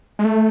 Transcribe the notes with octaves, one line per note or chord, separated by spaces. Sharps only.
G#3
A3